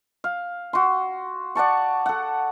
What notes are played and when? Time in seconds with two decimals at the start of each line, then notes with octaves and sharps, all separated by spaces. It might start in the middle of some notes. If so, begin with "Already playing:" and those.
0.24 F5
0.73 F#4 C6
1.55 D5 F#5 A5 C#6
2.06 A4 F#5